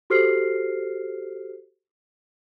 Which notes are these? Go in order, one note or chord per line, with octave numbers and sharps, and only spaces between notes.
F#4 G4 A4 C5 F6 C7